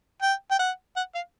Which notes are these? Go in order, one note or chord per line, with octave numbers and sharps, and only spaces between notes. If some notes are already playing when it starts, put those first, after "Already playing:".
G5
G5
F#5
F#5
F5